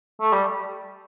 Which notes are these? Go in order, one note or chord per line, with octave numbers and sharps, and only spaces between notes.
A3
G3